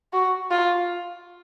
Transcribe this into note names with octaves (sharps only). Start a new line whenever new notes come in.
F#4
F4